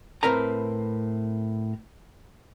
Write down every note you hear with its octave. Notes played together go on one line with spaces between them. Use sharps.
A2 C4 A#4 B4 A#5